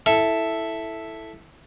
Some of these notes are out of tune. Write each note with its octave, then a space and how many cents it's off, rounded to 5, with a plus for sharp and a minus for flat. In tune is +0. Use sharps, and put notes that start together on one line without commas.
E4 +0 A4 +0